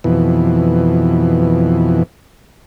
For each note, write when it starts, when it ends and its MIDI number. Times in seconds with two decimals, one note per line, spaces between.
0.04 2.03 41
0.04 2.03 47
0.04 2.03 52